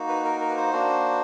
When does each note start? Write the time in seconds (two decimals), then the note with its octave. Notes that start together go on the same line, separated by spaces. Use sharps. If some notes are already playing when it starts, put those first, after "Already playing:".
Already playing: A#3 D#4 F#4
0.08 B4
0.25 A#4
0.41 A#4
0.50 B4
0.57 C5
0.73 A#3 D4 F#4